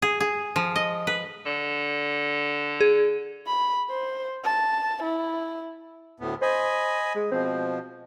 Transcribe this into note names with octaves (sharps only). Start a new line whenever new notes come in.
G#4
G#4
F3
D#5
B4
D3
G#4
B5
C5
A5
E4
D2 A2 B3
C5 D#5 G#5 B5
G#3
B2 F3 C4